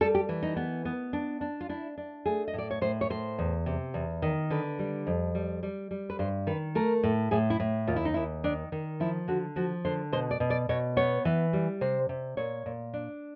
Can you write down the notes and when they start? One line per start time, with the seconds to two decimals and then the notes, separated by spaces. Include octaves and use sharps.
0.01 G3 A4
0.15 G4
0.29 E3
0.43 D#4
0.56 B3
0.85 B3
1.13 D4
1.41 D4
1.61 F4
1.69 D4 E4
1.97 D4
2.26 A3 G#4
2.48 D#5
2.53 A2 D5
2.71 C#5
2.81 A2 C5
3.01 C#5
3.10 A2 C5
3.39 E2
3.66 C3
3.94 E2
4.22 D#3
4.50 D3 B4
4.79 G3
5.07 F2
5.35 G3
5.63 G3
5.91 G3
6.10 B4
6.19 G2 C5
6.47 D#3 B4
6.75 A3 A#4
7.03 A2
7.31 A2 G#4
7.50 E4
7.60 A2
7.87 D#2 F4
7.96 E4
8.05 D#4
8.14 D#2 E4
8.44 D#3 D4
8.72 D#3
9.00 F3 E4
9.28 D3 F#4
9.56 F3 F#4
9.85 D3 C5
10.12 B2 C5
10.31 D5
10.40 B2
10.50 D5
10.69 B2 C#5
10.97 B3 C#5
11.25 E3
11.53 G3
11.81 C3 C5
12.09 C3
12.37 A#2 C#5
12.66 A#2
12.94 D4